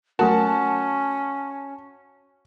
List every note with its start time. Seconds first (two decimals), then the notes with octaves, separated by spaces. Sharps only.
0.19 F#3 A3 C#4 F#4 A#4 A5